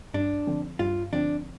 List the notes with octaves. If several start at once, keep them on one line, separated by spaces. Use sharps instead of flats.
G2 D4
D3 F3 C4
G2 F4
D3 F3 C4 D4